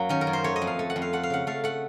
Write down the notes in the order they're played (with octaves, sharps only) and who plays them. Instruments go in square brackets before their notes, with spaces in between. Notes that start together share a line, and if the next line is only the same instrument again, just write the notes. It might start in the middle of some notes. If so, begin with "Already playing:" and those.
Already playing: [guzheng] F#2 F#3 A#3
D#3 C#4
A#4
F#2
C5
A3 C#5
D#5
F2
F5
A3
F#5
F2
F5
A3 F#5
F5
C#3 F#5
A3 F5
A3 F#5